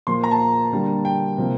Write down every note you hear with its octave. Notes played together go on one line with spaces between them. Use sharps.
A#2 F3 A#3 C6
A#5
A5
D3 G3 A#3
G5
C3 F3 A#3